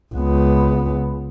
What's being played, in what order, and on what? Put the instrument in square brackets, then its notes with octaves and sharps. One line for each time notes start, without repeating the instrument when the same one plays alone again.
[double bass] C#2 B3